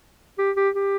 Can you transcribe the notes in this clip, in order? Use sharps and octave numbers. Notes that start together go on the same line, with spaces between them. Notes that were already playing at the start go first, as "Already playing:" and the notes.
G4
G4
G4